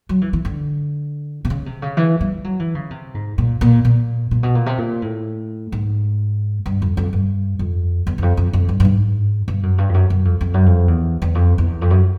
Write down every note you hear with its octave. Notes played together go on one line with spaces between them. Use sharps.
F#3
E3
E3
D3
C3
C#3
C3
C#3
E3
G3
F#3
E3
C#3
C3
G#2
A#2
A#2
A#2
A#2
B2
A#2
C3
A#2
A2
G#2
G2
F2
F2
G2
F2
E2
E2
F2
F2
F2
G2
G2
G#2
G2
F#2
G2
F2
F#2
F#2
F2
F2
F#2
F2
E2
E2
F2
E2
F2
F#2